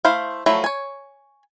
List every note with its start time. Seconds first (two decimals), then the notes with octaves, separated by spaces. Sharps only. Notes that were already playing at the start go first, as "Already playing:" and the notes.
0.05 A3 E4 C5 F5
0.46 F3 F#3 A3 E4
0.64 C#5 G#5